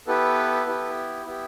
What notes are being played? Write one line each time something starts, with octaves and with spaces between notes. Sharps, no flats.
B3 E4 G4 A4 B4
B3 E4 G4
B3 E4 G4